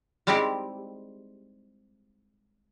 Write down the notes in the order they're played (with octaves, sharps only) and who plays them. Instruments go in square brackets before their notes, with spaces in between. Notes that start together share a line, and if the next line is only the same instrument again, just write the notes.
[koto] G3 G#3 C4 D#4 E4 G4